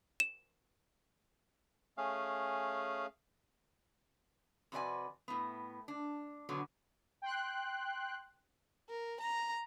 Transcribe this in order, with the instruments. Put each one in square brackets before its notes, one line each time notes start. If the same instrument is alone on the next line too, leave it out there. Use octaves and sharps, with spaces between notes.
[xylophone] E7
[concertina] A3 C#4 G#4 F5
[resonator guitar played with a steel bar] F2 C3 F#4 B4 D5 G#5
A2 B3
D4
B2 D3 F#3 B3
[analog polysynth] G5 C6 F#6
[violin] A#4
A#5